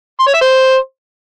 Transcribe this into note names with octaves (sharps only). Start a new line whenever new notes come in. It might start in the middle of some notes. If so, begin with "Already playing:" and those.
C6
C#5
E5
C5